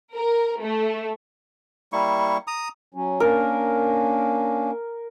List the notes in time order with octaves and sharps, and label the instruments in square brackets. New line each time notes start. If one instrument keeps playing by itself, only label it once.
[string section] A#4
A3
[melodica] G3 A#3 E4 C#6
A#5 D#6
[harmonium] F#3 C#4
[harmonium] A#3 C#4 D4 [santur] A#4